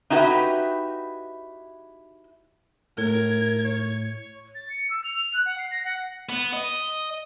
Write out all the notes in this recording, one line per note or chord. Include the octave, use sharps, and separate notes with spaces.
D#4 E4 F#4 G4 B4
A2 A#4 G#6
C#5
A6
C#7
E6
F7
F7
F#6
F#5
C7
A#6
F#5
B3
D#5